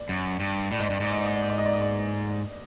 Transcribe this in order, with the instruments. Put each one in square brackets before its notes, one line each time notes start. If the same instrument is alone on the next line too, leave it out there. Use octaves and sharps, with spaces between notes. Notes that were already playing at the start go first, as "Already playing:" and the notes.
Already playing: [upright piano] D5
[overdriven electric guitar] F#2
G2
[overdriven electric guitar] A2 [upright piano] D5
[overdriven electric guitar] G#2 [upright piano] D#5
[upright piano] D5
[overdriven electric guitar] G2
[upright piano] D#5
[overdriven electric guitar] G#2 [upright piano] D5
[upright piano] D#5
D5
D#5
D5
D#5
D5
D#5
D5
D#5
D5